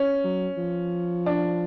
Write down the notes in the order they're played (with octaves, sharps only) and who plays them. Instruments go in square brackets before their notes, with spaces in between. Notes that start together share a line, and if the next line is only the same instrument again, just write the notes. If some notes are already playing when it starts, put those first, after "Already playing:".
Already playing: [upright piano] C#4
[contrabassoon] F#3
F3
[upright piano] D4